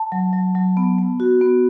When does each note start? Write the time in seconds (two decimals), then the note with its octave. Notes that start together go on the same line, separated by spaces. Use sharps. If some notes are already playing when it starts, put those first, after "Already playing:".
Already playing: A5
0.12 F#3
0.33 F#3
0.55 F#3
0.77 B3
0.99 B3
1.20 F#4
1.41 B3